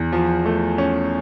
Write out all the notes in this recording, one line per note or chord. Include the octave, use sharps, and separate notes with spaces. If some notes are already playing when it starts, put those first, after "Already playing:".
Already playing: E2
F3
A3
C#4